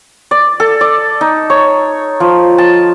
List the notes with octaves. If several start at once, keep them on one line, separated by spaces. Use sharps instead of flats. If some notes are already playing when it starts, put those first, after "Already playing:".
D5
A4
D5
D#4
C#5
F3
A5